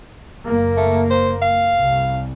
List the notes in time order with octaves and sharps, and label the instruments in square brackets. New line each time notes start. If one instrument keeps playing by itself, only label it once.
[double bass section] F#1 A#3
[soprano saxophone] A3
C5
F5
[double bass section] C2